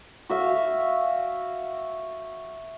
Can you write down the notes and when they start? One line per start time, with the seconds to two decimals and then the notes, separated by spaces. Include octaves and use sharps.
0.30 F#4 E5 F5